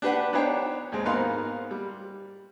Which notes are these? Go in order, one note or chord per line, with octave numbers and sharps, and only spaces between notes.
D4 G4 B4 F#5
B3 D4 D#4 C5 C#5 G5
D#2 G#3 C4
G#2 A#3 B3 D#4 F5 C6
G3